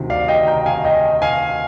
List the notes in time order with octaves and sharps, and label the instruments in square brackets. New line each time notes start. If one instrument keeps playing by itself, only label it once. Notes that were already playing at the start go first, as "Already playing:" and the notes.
Already playing: [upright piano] D2 C3 D#3
D5 F5
D#5 G5
G5 A#5
F5 G#5
D#5 G5
F5 G#5